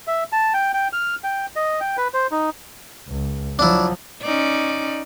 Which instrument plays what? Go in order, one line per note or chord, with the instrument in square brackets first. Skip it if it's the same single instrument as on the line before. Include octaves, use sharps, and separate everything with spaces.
[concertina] E5
A5
G5
G5
F6
G5
D#5
G5
B4
C5
D#4
[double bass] C#2
[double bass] F3 F#3 [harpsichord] D4 E4
[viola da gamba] C#4 D#4 D5